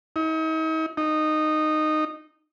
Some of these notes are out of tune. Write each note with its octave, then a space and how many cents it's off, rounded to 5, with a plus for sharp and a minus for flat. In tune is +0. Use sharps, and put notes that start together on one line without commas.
D#4 +40
D#4 -15